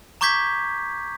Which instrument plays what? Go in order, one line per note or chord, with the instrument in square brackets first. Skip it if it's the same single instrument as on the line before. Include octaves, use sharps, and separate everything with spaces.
[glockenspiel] A#5 C#6 D6 G6 G#6 B6